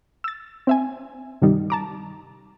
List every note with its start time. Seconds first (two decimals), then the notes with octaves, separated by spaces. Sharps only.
0.24 E6 A6
0.67 C4 E5 G#5
1.42 G2 C3 D#3 G3 D#4
1.70 A5 A#5 D6